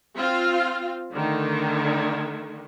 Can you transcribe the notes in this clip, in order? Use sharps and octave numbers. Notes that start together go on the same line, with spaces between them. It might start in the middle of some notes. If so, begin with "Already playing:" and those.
C4 F4 F5
D3 D#3 A3